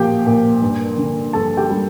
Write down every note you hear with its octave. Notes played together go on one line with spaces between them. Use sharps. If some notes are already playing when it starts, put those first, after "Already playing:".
Already playing: A#2 F3 G4 G5
A#2
G2
D3
G2 A4 A5
G4 G5
G3